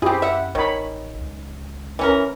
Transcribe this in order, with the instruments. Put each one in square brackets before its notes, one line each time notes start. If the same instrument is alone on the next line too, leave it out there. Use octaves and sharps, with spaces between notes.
[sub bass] F#2 [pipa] C4 G#4 [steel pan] E4 G4
[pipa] E5 F#5
[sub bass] A1 [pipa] D#3 [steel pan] C#5 B5
[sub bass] C#2
[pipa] E3 C#4 A#4